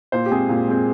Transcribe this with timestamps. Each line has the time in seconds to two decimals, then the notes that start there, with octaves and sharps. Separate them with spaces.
0.12 A#2 C5
0.26 G4
0.31 G#3 C4 G#4
0.49 A#2
0.68 G#3 C4